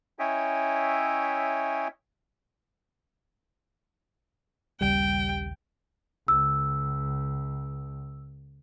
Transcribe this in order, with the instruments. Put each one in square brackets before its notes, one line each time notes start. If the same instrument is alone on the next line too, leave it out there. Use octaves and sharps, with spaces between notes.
[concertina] C#4 E4 C#5 D#5 E5 G5
[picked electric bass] A#1 D#2 C#3 [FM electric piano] G3 [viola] G5
[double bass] C#2 [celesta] E6